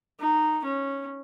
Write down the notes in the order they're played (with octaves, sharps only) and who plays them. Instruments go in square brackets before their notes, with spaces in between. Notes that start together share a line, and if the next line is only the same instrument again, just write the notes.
[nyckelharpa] D#4
C#4